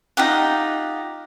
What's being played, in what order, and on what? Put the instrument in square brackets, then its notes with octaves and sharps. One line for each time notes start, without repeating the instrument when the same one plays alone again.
[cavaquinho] D#4 F4 G4 F#5